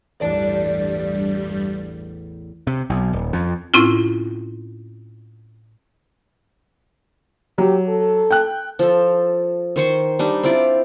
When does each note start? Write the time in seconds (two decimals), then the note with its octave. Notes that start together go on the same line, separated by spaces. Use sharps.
0.21 A1 E2 G2 G3 D5 A5
2.67 C3
2.90 B1
3.13 D#1
3.33 F2
3.74 A2 C4 C#4 E4 F4
7.58 F#3 G4
7.88 A4
8.31 G5 F#6
8.79 F3 A4
9.76 D#3 C5 C#6
10.19 G3 D4 D#4
10.43 C4 E4 F4 D5